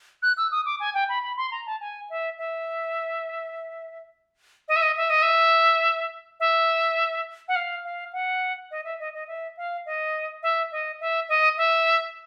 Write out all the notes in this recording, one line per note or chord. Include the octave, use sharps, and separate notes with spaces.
F#6
E6
D#6
D6
G#5
G5
B5
B5
C6
A#5
A5
G#5
E5
E5
D#5
E5
D#5
E5
D#5
E5
E5
F#5
F5
F5
F#5
D#5
E5
D#5
D#5
E5
F5
D#5
E5
D#5
E5
D#5
E5